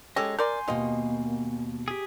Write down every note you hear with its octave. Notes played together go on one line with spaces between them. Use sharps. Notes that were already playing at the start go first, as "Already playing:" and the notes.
G#3 C#4 G4 A4 C#5 D#5
A#4 D5 G#5 C6 G6
D#2 B2 A#3 F4 D#5
G4 G#4